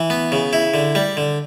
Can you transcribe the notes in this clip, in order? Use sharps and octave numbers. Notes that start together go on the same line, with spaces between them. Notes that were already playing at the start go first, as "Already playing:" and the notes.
Already playing: E3
B3
C#3
E4
D3
G3
D3